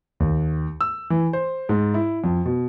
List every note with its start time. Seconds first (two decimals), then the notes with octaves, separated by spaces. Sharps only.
0.20 D#2
0.81 E6
1.10 E3
1.33 C5
1.69 G#2
1.94 E4
2.24 F2
2.46 B2